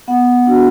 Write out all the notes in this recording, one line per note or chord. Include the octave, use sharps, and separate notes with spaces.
B3 F#5
D4 F#4